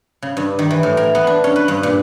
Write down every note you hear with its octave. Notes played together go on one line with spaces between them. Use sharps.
C#3
G2
D#3
E3
A2
A#4
B3
D4
C#4
B4
G2
A#2